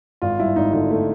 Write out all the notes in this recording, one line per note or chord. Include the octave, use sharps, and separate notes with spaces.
G#1 F4
G2 E4
G#1 D#4
D3 D#4
A3